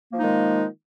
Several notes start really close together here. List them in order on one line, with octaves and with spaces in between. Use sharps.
A#3 F3 D#4 G#3 D#3